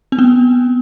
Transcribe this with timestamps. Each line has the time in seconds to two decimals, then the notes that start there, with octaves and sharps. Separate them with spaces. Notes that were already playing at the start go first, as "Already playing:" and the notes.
0.12 C4
0.19 B3